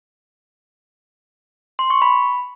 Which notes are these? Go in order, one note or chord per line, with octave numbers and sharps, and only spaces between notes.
C6
C#6
B5